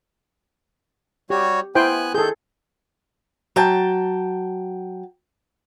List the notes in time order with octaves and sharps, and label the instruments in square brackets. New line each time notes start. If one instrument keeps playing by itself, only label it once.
[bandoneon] G3 F#4 C#5 [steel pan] G4
[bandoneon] B3 G#5 F#6 [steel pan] E4 C5 G5
[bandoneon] D#3 G6 [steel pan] G#4 A4
[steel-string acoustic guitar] F#3 G5 A5